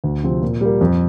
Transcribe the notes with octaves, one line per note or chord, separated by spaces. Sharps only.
D2
C3 F3 C4
A#2
G3 A#3
F2